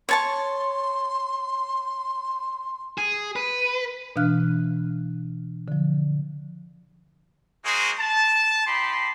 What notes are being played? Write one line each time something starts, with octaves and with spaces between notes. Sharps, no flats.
C#5 A5 C6 C#6
G#4
B4
B2 E3 D4 F5 F6 F#6
D3 F3
G#3 A#3 D#4 F#4 G#4 C5
A5
D#4 G4 B5 C6